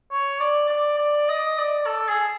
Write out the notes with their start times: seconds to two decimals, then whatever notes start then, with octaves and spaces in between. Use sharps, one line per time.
0.11 C#5
0.40 D5
0.69 D5
0.99 D5
1.29 D#5
1.58 D5
1.86 A4
2.09 G#4